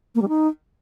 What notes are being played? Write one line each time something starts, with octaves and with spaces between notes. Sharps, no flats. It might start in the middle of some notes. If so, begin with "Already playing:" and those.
A#3
G3
D#4